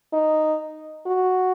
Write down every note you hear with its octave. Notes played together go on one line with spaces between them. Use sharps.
D#4
F#4